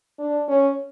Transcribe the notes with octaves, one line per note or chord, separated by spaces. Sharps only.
D4
C#4